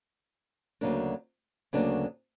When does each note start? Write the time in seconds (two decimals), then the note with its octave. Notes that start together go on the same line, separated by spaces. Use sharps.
0.81 D2 C#3 F#3 A#3 D4
1.73 D2 C#3 F#3 A#3 D4